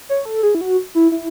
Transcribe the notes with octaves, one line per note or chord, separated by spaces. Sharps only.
C#5
A4
G#4
E4
F#4
E4
E4